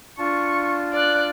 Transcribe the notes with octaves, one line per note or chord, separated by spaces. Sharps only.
D4 F4 A5 C#6
D5 F#6